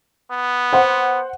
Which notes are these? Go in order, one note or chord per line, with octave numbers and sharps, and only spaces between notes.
B3
C5 F#5